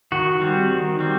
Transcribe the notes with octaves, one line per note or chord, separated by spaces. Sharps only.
D#3 F#4
G3 C4
D#3
G3 C4